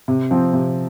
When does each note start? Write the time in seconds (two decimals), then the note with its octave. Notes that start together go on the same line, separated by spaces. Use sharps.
0.08 C3
0.31 F3 C4
0.53 C3